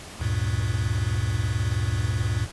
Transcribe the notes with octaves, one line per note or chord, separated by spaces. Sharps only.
D2 G2 A#2